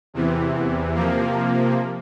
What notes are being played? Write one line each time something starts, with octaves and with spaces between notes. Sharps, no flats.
E2 C3 E3
C3 F3 A#3